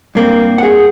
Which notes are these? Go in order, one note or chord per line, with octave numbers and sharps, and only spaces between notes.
G2 A#3 C4
G#4 F#5